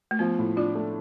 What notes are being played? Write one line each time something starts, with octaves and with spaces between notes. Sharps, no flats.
A3
F3 B3
A2
D4 F4
A3